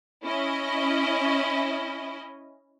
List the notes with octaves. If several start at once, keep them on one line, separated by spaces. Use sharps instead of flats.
C#4 E4 D#5